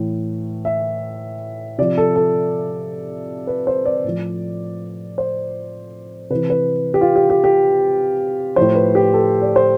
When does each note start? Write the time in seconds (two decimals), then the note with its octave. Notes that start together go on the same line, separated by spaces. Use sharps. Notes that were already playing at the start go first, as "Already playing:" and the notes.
Already playing: A2 E3
0.65 E5
1.78 C3 F3 D5
1.97 A4
2.16 A4
3.47 B4
3.67 C5
3.85 D5
4.04 A2 F3
5.18 C5
6.30 C3 E3 B4
6.50 B4
6.94 G4
7.01 F4
7.16 G4
7.30 G4
7.44 G4
8.56 A2 F3 C5
8.75 B4
8.95 G4
9.14 A4
9.42 D5
9.56 C5